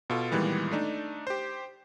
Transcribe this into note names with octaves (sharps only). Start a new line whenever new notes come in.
B2 F4 A4
A#2 D#3 E3 G3 G#3 B3
A3 D4 D#4
G4 C5